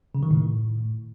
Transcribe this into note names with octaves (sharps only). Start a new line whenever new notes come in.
C#3
D#3
A2